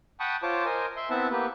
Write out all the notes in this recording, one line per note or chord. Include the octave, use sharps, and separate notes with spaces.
F#5 G5 A5 B5 C#6 D#6
F4 C5 C#5 A5 D6
A#4 C5 D#5 G#5
E5 C6
B3 C4 E4 E5 F#5 A5
A#3 B3 G4 B4